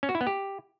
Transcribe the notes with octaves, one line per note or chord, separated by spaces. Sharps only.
C#4
F#4
E4
B3
G4